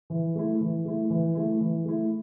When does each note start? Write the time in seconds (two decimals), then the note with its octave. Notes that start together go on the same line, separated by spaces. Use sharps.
0.10 E3
0.35 A3 E4
0.61 E3
0.85 A3 E4
1.10 E3
1.35 A3 E4
1.61 E3
1.85 A3 E4